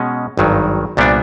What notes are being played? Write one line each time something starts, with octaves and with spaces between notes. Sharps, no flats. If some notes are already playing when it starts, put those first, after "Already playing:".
Already playing: B2 G#3 C#4
G#1 G2 D#3 F#3
C2 A#2 G3 B3 D4